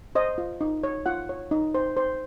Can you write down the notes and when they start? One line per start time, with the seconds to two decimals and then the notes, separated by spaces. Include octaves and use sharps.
0.15 C5 D#5
0.38 F4
0.61 D#4
0.83 C#5
1.06 F4 F#5
1.29 C#5
1.51 D#4
1.75 C5
1.97 C5